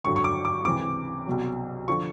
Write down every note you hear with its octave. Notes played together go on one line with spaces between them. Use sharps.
G#1 G2 D3 F#3 C#6
C#6
D6
D6
C#2 C3 E3 D6
C2 B2 F#3
D3 F3 C#6